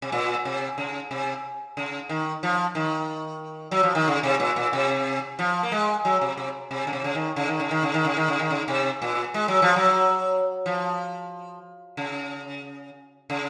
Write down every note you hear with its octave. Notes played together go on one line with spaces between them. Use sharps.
C3
A#2
C3
C#3
C3
C#3
D#3
F3
D#3
F#3
F3
D#3
C#3
C3
A#2
A#2
C3
F3
A#3
G#3
F#3
C3
C3
C3
C#3
C3
C#3
D#3
C#3
D#3
C#3
D#3
C#3
D#3
C#3
D#3
C#3
D#3
C#3
C3
A#2
G#3
F#3
F3
F#3
F3
C#3
C#3